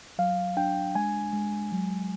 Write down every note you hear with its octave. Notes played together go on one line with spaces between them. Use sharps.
F#3 F5
D4 G5
G#3 G#5
G#3
F#3